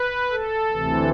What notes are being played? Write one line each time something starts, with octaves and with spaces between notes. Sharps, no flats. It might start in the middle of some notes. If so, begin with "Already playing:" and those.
Already playing: B4
A4
D2 C3 E3